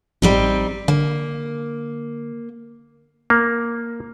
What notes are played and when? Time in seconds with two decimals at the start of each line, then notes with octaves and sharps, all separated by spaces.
0.22 A1 G3 C4 D#4
0.88 D3 A#3
3.30 A#3